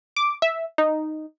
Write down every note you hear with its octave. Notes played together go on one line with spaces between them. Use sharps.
D6
E5
D#4